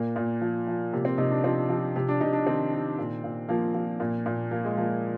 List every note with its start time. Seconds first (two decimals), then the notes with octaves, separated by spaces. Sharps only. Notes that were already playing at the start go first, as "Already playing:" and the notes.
Already playing: A#2 A#3
0.16 A#2
0.41 F3
0.67 F3
0.93 C3 A#3
1.05 C4
1.18 C3 D#4
1.31 D4
1.44 F3 C4
1.69 F3
1.96 C3
2.09 D4
2.21 C3 D#4
2.33 D4
2.46 D#3 C4
2.73 D#3
2.98 A#2
3.24 A#2
3.49 F3 A#3
3.74 F3
4.00 A#2
4.26 A#2
4.51 F3 A#3
4.65 G#3
4.77 F3 A#3